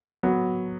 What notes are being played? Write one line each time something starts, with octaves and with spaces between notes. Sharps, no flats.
F#3 B3 F#4